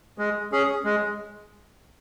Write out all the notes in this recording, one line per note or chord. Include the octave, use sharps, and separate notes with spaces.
G#3
C#4 G#4
G#3